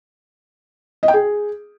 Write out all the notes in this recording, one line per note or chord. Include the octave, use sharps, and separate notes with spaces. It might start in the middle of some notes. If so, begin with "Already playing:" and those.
D#5
G5
G#4